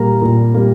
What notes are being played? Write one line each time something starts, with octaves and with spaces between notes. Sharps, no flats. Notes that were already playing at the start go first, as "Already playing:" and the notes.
Already playing: A#2 G3 A#3 A#5
A#2
G3 A#3